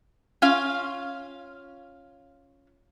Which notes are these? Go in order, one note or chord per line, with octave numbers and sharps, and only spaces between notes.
C#4 F4 F5